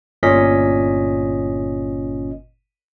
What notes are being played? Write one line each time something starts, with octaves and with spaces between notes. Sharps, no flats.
G1 A#2 C#4 D#5 B6